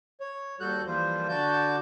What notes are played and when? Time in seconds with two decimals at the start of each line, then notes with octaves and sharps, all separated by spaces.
0.20 C#5
0.60 D#2 G3 F#4 A4 F#6 G6
0.86 E3 F3 G3 A#3 F4 C5
1.29 D3 F#4 D5 A5 G6